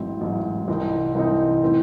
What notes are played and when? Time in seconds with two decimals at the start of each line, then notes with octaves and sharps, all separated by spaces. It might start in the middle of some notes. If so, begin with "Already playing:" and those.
Already playing: A1 G#2 F#3 C4 E4
0.21 A1 G#2 F#3 C4 E4
0.68 C2 C3 E3 C4 D#4
1.15 C2 C3 E3 C4 D#4
1.63 A2 E3 C4